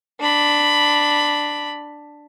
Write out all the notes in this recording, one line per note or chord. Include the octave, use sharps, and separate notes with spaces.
D4 B5